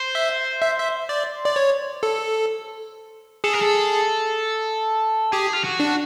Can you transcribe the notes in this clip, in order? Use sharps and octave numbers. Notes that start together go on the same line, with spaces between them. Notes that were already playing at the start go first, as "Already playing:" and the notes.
Already playing: C5
E5
E5
E5
D5
D5
C#5
A4
G#4 A4
A#4
A4
G4 G#4
F4
F#4
D4